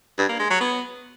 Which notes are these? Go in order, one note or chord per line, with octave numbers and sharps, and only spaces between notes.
G2
A#3
G#3
F#3
B3